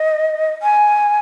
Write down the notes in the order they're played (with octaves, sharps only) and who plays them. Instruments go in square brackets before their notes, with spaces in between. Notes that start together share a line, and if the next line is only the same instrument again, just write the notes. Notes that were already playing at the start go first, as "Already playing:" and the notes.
Already playing: [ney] D#5
G#5